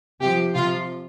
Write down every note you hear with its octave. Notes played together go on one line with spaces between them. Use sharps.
C3 F3 G4
C3 F3 F4